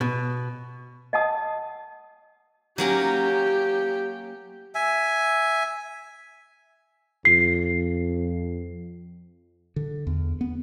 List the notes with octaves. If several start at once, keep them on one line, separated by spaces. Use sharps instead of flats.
B2
D#5 F#5 A5 D#6
F#3 A#3 C#4 G4
E5 G#5
F2 C7
D3
E2
B3